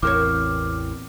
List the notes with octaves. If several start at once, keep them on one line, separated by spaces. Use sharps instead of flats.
A1 E2 E3 C4 A#4 C#5 D6 F6